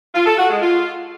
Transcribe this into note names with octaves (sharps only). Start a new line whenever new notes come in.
F4
A4
F#4
G#3
F4